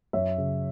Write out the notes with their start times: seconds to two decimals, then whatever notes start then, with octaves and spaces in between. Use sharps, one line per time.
0.13 F#2 C#5 E5
0.38 C#3